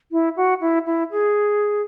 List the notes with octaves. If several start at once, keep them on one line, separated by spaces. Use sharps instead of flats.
E4
F#4
E4
E4
G#4